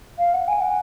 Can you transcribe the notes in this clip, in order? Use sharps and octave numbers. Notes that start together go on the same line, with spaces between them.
F5
F#5
G#5
F#5